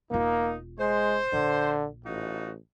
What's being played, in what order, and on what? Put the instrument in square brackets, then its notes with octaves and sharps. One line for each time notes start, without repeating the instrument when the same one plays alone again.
[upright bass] E1 F4 [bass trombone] A#3 [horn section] D#4
[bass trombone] G#3 [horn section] C5
[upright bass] A#1 [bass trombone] D3
[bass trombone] A1 [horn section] D#4 F4 F#4